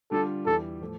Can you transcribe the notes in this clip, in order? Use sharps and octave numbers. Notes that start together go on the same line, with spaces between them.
D3 G3 D4 F4 A4
E2 E3 G3 A4
A2 F3 A3